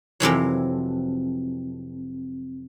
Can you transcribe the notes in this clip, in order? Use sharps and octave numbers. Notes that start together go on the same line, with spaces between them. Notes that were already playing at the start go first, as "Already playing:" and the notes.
F2 C3 E3 F#3